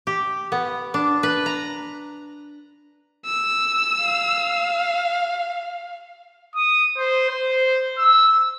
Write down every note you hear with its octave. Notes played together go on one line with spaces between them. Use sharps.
G4
B3
D4
B4
A#5
E6
F5
D#6
C5
C5
E6